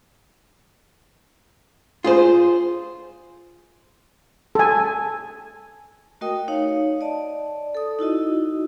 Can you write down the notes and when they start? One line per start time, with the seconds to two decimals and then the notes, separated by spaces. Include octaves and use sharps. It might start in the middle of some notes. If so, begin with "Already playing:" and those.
2.04 F4 G#4 C5
4.55 A4 G#5
6.21 A3 F#4 A#4 D#5 G5 D#6
6.48 D#4 C#5 F5
7.01 D5 D#5 A5
7.75 A4 D#6
7.99 D#4 E4 F#4 D#5